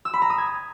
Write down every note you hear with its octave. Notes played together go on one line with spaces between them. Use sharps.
E6
B5
A#5
D#6
G#6